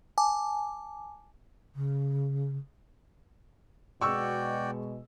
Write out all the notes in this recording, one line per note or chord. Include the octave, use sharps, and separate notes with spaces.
G#5 A5 D6
C#3
B2 G#3 F#4 D5 G5 C#6 E6